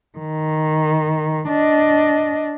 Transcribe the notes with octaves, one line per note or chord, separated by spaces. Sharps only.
D#3
D4 D#5